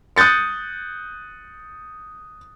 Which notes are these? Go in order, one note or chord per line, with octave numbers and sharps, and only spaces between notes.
D#6 F#6 G6 A6 C#7